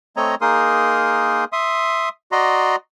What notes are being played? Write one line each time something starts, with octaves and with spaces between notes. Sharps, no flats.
A3 C4 C#5 D#5 A#5
A#3 D#4 G#4 A#4 C6 D#6
E5 C6 D#6
F#4 D5 D#5 A#5 C6